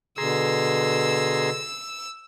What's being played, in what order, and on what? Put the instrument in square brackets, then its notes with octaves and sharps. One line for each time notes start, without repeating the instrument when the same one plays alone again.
[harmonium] B2 D3 [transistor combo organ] G#4 A#5 C6 [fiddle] E6